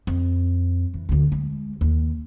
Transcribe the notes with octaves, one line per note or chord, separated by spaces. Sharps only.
F2
E3
D2 D3
G#3
D#2